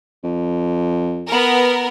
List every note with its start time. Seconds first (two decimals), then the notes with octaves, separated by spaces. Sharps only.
0.24 F2
1.28 B3 A#4